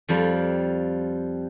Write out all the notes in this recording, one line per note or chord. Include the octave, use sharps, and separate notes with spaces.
F2 F3 G3